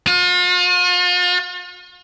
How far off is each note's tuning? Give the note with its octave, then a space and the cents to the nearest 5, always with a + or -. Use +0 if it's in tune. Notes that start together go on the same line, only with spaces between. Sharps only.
F4 +40